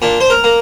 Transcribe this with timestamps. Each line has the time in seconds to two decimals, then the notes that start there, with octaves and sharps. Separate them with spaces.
0.02 A#2 D4
0.21 C5
0.30 A#4
0.44 A#3